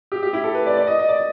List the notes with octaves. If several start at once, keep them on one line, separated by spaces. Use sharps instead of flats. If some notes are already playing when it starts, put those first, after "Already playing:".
G4
G4
E4
A4
B4
D5
D5
D#5
D#5
D5